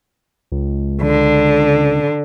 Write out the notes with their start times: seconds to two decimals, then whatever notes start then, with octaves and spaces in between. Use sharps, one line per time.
0.52 C#2
1.02 D3